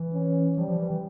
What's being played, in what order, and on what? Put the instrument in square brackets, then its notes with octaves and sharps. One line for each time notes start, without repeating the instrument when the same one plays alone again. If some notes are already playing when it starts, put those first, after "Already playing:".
Already playing: [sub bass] E3
[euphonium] C#4
[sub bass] F3 [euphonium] G3
[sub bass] F3
E3
E3